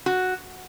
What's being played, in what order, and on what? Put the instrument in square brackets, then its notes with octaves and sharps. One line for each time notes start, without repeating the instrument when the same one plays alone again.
[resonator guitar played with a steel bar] F#4